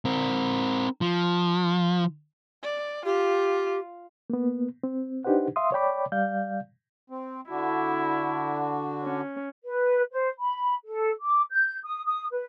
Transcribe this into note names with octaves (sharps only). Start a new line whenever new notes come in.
C4 A#4
F3
D5
F4 G4
A#3 B3
C4
D4 D#4 G4 B4 C5 F#5
E5 F5 C6 D#6
C#5 D5 G5 B5 D6
G3 D5 F5 G6
C4
D3 D4 E4 F#4
C#4
B4
C5
B5
A4
D6
G6
D#6
D#6
B4